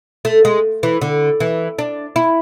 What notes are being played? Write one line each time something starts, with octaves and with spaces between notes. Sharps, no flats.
A3
G#3
E3
D3
E3
D4
E4